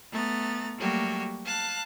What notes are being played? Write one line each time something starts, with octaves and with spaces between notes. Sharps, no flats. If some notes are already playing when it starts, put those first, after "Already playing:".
A3 B3 A#5 A6
F#3 G3 A3 A#3 F#4 G4
F5 A5 F#6